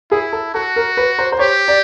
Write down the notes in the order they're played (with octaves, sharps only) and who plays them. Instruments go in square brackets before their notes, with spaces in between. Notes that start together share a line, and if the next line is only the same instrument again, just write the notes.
[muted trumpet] E4 [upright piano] G#4
[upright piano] A4
[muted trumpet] F#4 [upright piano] A4
[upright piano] A#4
B4
C5
C5
[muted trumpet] G4 [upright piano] C#5
[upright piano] D5